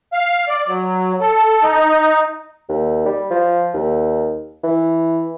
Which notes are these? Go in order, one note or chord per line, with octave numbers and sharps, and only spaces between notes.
F5
D5
F#3
A4
D#4
D#2
G3
F3
D#2
E3